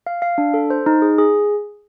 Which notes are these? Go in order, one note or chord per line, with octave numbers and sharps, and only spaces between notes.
F5
F5
D4
A4
C5
D#4
G#4
G#4